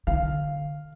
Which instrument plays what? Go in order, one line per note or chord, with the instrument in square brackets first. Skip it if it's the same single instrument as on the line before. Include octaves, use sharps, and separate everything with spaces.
[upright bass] D3 [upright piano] F5